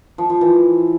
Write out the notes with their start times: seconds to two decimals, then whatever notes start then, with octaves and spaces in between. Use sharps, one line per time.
0.18 F3
0.30 F3
0.41 E3